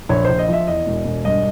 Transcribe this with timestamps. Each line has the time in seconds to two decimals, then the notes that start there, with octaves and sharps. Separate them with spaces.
0.09 A#1 C#5
0.25 A#1 C5
0.39 D#5
0.48 F3 E5
0.67 E2 D#5
0.87 E1
1.05 E1
1.25 G2 D#5